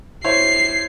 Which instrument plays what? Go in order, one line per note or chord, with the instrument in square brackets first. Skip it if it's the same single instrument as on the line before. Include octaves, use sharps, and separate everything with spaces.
[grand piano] E4 C5 C#5 [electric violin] C7